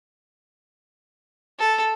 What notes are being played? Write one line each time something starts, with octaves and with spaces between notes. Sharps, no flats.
A4